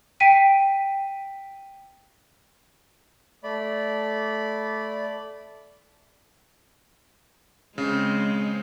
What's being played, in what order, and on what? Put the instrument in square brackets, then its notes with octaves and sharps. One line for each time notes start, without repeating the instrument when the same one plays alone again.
[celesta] G5 B6 D7 D#7
[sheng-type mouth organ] A3 D5 B5
[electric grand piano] C#3 [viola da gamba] G#3 C4